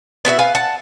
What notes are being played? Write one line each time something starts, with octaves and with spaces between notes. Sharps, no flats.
B3 E4 F#4 E5
B4 F5 G#5
F#5 A5